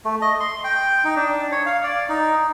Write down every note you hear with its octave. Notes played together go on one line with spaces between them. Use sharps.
A3
D#5
C6
G5
D#4
D4
C#5
F5
D5
D#4